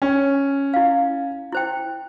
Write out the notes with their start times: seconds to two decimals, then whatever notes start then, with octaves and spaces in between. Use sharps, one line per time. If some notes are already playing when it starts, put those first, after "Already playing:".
0.02 C#4
0.74 E4 F5
1.52 E4 C5 G5